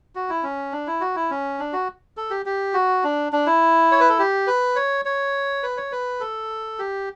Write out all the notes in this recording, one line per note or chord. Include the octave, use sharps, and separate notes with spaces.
F#4
E4
C#4
D4
E4
F#4
E4
C#4
D4
F#4
A4
G4
G4
F#4
D4
D4
E4
C#5
B4
A4
G4
B4
C#5
C#5
B4
C#5
B4
A4
G4